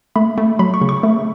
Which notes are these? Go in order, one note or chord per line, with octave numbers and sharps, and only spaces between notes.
A3 B5
A3
F#3 B5
C#6
C#3
C#6
A3